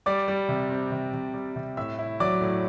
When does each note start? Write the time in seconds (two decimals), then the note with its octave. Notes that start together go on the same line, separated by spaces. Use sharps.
0.06 G3 D5 D6
0.28 G3
0.49 C3
0.70 C4
0.92 C3
1.13 C3
1.34 G3
1.56 C3
1.77 A2 E5 E6
1.99 E4
2.20 F#3 D5 D6
2.41 A2